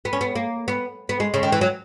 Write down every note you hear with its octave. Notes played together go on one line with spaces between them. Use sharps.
B3
C#4
B3
A#3
B3
B3
G#3
C#3
D#3
E3
F#3